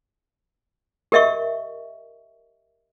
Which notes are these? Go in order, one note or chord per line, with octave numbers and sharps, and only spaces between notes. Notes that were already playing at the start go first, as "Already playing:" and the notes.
G4 A#4 D#5 E5 C#6